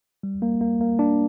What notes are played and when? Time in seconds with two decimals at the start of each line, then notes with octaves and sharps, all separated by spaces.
0.23 G3
0.42 A#3
0.61 A#3
0.81 A#3
0.99 D4